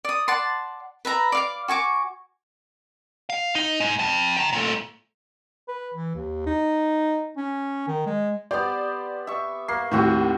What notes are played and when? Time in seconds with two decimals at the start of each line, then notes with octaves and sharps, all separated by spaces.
0.05 D5 D#6
0.28 D5 F#5 A5 C6
1.05 B4 E5 A#5
1.32 D5 F5 D6
1.68 F#4 G#5 C#6 D6
3.30 F5
3.55 D#4
3.80 G#2
3.99 F2
4.37 G5 A#5
4.53 A#2 A3
5.68 B4
5.94 E3
6.15 D#2
6.47 D#4
7.37 C#4
7.88 D#3
8.06 G#3
8.51 B3 G4 C5 D5
9.27 E5 C#6
9.68 A#3 C7
9.91 D#2 A2 C4 F#4 C5